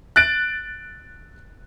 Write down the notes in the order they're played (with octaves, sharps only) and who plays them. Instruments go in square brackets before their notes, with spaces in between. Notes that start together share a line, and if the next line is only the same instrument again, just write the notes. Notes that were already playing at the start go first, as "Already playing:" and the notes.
[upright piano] F#6 A6 D7